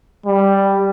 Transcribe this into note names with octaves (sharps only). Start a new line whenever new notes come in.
G3